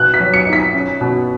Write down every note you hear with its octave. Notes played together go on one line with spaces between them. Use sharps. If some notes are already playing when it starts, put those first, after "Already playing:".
Already playing: B2 B3 F#6
B6
F#3
C#7
D#4
B6
C#4
B2